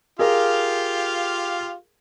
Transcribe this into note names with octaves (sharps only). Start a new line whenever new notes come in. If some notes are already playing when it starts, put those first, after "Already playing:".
F4 G4 G#4 A#4 F5